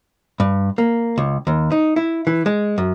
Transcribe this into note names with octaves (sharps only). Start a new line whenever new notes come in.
G2
A#3
C#2
D#2
D#4
E4
E3
G#3
F#2